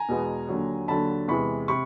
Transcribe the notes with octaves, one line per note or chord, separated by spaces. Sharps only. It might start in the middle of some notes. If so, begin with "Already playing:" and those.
Already playing: G#5 A#5
E2 B2 G#3 B3
D#2 D3 F#3
D#2 D3 F#3 A5 B5
E2 C3 E3 G#3 B5 C#6
C3 B5 C#6